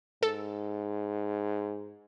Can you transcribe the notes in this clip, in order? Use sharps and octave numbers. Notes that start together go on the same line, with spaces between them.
G#2 A4